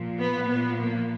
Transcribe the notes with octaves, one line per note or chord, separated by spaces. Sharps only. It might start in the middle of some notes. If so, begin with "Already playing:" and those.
Already playing: A#2 F3
B3
A#2 F3 B3
A#3